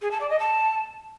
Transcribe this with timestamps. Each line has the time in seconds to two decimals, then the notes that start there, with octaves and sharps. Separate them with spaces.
0.02 G#4
0.11 A5
0.20 D5
0.30 D#5
0.39 A5